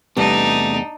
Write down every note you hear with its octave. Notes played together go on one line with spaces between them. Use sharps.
E2 C3 G3 A3 D4 D#4